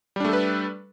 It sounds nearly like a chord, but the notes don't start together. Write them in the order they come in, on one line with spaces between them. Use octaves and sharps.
G3 D4 A3 A4 B4